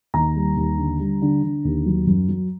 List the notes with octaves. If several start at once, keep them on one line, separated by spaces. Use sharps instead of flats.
D#2 A#5
G3
D#2
D3
G3
D3
D3
D#2
F#3
F#2
F#3